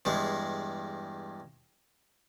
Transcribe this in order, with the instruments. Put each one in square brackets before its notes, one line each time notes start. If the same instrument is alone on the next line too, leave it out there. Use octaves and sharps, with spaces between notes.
[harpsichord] E2 G2 G#3